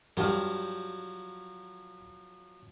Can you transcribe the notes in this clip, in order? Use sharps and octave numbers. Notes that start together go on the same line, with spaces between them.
G2 F3 F#3 G4 F6